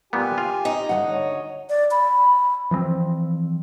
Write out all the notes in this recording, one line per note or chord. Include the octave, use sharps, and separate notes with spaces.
A#2 G3 B3 G4 G#5
F4
D#4
D2 F3 F#5
C#5
D5
B5
E3 F3 G#3 C4